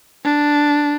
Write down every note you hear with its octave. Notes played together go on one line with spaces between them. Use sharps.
D4